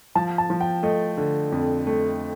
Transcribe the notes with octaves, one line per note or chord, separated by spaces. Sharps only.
F3 A5
A5
F3
G5
A3 D#5
D3
F2
A3